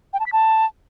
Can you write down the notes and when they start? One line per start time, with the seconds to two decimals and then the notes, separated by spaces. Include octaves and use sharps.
0.13 G5
0.20 A5
0.26 B6
0.33 A5